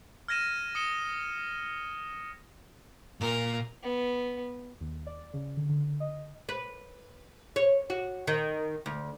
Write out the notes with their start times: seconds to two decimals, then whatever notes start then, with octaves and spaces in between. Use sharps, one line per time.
0.28 F6 G#6 A#6 D#7 E7
0.75 D#6 C#7 E7 G7
3.21 A#2 A#4
3.83 B3
4.80 D#2
5.07 D5
5.33 C#3
5.57 D3
5.69 D3
6.00 D#5
6.49 B4
7.56 C#5
7.90 F#4
8.27 D#3
8.86 D2